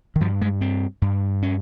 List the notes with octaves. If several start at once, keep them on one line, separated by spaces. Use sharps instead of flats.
D#3
G2 F3
G#3
C4
G2
C#4